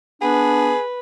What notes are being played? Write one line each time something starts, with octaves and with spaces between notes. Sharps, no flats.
B3 D4 G#4 B4